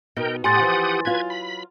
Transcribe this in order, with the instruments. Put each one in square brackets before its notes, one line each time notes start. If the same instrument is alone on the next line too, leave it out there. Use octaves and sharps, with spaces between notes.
[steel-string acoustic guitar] B2 B3 D#4 [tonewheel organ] A#4 G5
[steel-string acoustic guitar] A2 [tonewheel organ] G4 F#5 D#6 [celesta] G#5 C6 A6
[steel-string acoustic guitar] E3 F3
[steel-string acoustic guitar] F#3 F4 [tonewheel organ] B4 G#6
[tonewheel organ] B5